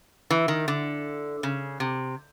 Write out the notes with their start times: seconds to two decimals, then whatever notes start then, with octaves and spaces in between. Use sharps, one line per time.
0.30 E3
0.48 D#3
0.68 D3
1.43 C#3
1.80 C3